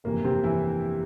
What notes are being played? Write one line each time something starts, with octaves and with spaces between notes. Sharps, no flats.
G1 F2 C3 E3 A#3
C3 C4
E3 E4